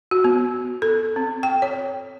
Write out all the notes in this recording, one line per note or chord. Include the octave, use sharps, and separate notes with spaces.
F#4
B3
A4
C4
G5
C#5